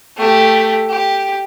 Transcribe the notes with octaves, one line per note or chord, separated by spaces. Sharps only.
A3 G4
G4